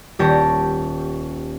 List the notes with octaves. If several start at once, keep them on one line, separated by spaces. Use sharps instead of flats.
D#1 G4 C#5 A5 A#6 D7